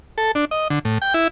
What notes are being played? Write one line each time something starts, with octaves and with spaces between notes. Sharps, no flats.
A4
D4
D#5
D3
A2
G5
E4